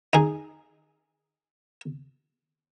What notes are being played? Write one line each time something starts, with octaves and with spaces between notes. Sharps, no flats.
D#4 G#4